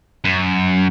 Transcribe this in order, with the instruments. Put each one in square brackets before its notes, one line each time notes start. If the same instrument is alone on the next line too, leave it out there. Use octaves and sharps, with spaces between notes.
[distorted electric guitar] F#2